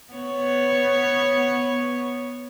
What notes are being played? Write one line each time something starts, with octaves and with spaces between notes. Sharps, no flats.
B3 C#5